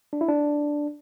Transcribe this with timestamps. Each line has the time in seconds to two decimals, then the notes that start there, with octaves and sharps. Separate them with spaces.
0.13 D4
0.21 E4
0.29 D4